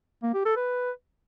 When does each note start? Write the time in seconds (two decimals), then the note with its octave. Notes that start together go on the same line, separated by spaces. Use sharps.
0.23 A#3
0.34 G4
0.45 A4
0.57 B4